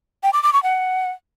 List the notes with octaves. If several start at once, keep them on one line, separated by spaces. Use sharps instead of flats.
G5
D6
D6
C#6
F#5